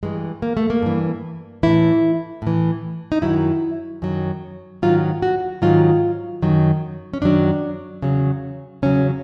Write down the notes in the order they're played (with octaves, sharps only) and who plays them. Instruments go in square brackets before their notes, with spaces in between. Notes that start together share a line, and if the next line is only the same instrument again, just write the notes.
[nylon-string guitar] G2 E3 G#3
A#3
A3
A#3
G2 E3
A2 E3 E4
A2 E3
D#4
F#2 D#3 F#3 E4
F#2 D#3 F#3
G#2 D#3 F#3 F4
F#4
G#2 D#3 F#3 F4
F#2 D#3 F#3
C#4
F#2 D#3 F#3 D4
E2 C#3 F#3
E2 C#3 F#3 C#4